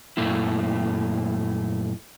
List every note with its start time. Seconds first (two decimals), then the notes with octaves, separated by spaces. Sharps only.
0.17 F#2 A#2 A3 A#3 E4